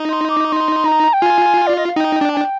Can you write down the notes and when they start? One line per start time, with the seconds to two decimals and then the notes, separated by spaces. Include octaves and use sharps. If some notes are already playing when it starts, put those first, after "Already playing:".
Already playing: D#4
0.10 C6
0.29 D6
0.47 D6
0.52 C6
0.85 A#5
1.13 G5
1.22 F4 G#5
1.67 D5
1.77 D#5
1.86 F5
1.96 D#4 G5
2.21 D4
2.33 G#5
2.37 G5